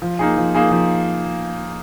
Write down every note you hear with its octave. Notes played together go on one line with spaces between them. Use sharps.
F3
A#3 D#4 G#4
F3
A#3 D#4 G#4
F3